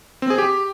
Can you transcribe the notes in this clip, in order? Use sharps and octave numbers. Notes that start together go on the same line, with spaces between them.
C4
G#4
G4